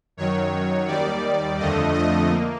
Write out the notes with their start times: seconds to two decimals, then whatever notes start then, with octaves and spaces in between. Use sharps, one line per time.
0.17 F#2 D#3 F#3 C#5
0.87 D#2 D#3 G3 D5
1.59 F2 D3 F3 A3 D#5
1.94 D#5
2.29 A#3